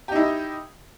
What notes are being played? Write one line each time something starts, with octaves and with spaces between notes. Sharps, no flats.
D#4 E4 G4 D#5